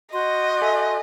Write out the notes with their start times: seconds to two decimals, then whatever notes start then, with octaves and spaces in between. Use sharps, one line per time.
0.13 F#4 D#5 C6 G6
0.62 A4 E5 G#5